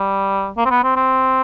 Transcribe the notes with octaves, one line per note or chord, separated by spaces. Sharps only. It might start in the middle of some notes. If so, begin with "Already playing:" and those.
Already playing: G3
A#3
C4
B3
C4
C4